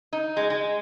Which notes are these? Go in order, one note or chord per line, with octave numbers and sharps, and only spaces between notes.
D#4
G#3
G#3